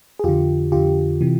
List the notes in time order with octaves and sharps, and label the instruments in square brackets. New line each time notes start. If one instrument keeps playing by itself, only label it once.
[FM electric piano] G#4
F2 D3 F4 G4
F2 D3 F4 G4
C3 E3